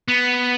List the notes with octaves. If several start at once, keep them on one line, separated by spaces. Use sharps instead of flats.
B3